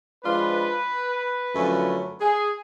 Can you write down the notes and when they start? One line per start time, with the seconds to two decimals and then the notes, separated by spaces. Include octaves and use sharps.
0.23 F3 G#3 D4 F4 B4
1.55 F#2 D3 F3 A3 C#4
2.21 G#4